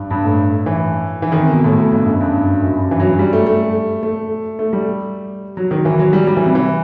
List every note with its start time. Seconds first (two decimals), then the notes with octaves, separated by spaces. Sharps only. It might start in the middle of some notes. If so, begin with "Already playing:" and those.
Already playing: G2
0.10 G2
0.24 A2
0.66 E3
1.22 E3
1.32 D#3
1.41 C3
1.51 B2
1.64 A2
1.78 A2
1.92 G2
2.07 F#2
2.21 G2
2.62 F#2
2.77 G2
2.91 E3
3.00 F#3
3.19 G3
3.33 A3
3.47 A3
4.03 A3
4.59 A3
4.73 G3
5.57 F#3
5.71 D#3
5.85 E3
5.99 F#3
6.13 G3
6.27 G3
6.37 E3
6.45 C3
6.55 E3